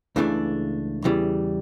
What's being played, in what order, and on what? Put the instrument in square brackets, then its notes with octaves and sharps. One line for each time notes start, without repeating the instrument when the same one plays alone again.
[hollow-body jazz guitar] C#2 C#3 E3 A3 D4
E2 C#3 E3 G3